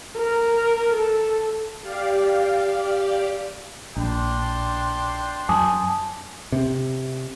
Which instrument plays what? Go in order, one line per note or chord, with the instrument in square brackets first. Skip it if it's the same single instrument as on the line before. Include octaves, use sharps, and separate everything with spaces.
[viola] A#4
A4
[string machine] G4 D5 F5
[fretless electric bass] A#1 [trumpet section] D4 G5 C6
[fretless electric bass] F#2 [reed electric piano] G#5 D6 D#6 [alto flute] A5
[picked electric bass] C3